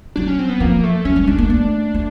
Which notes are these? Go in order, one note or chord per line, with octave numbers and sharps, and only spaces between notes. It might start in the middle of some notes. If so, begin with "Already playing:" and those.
F#3 D4
C#4
C4
B3
F3 A#3
A3
F#3 C#4
G3
G#3 D4
A#3
A3
A3